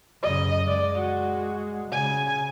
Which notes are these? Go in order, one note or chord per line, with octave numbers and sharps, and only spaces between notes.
F#2 C#3 D#5
G#3 D5
F#4
C#3 G#5